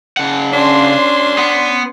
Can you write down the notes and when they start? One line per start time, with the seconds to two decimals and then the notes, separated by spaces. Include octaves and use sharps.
0.17 C#3 F#5
0.53 C#4 D4 C6
1.38 B3